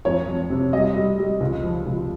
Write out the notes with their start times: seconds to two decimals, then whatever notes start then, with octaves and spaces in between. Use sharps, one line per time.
0.05 F2 C#5
0.28 F2
0.50 C3
0.73 G3 D#5
0.96 G3
1.18 G3
1.40 C#2
1.64 F3
1.86 C#2